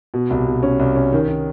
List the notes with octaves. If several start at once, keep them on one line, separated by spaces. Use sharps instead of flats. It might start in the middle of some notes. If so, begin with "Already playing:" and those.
B2
C2
B2
C#4
C2
C#4
D#3
D#3